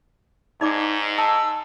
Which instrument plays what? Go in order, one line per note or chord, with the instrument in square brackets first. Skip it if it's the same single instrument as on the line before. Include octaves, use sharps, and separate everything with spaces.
[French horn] G#2 [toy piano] D#4 D5 D6
[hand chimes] A5 [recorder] E6